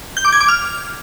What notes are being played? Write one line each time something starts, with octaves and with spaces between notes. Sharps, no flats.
G6
D6
G#6
D6
F6